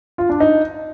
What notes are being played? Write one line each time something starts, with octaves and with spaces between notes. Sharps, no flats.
F4
D4
D#4